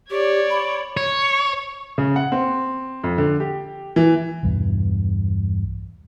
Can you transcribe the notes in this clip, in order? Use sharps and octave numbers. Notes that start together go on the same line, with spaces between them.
G4 C#5 D5
B5
C#5
C#3
F#5
C4
F2
D3
G4
E3
B1 E2 G2